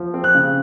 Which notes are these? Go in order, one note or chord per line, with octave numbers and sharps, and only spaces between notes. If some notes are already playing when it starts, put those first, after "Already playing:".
Already playing: F3
C4
F#6
C#3